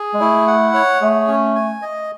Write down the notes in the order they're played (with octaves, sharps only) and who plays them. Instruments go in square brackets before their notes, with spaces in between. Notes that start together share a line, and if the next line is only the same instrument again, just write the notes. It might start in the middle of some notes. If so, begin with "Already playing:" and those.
Already playing: [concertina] G#4
[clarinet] G#3
[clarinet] A3 [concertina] E4
[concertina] F#5
C#5
[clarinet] A3 [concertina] G#4
[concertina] C#4
G#5
D#5